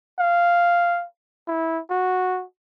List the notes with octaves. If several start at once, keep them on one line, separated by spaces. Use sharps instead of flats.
F5
E4
F#4